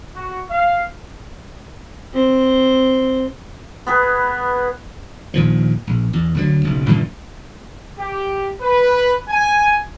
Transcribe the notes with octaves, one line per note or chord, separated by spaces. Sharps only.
F#4
F5
C4 C5
B3 G#4 B4
A#1 D#2 A#2 F3
A#1
E2
D2 D3 F#3
F#1 B1
F#2 A#2 D3 E3
G4
B4
G#5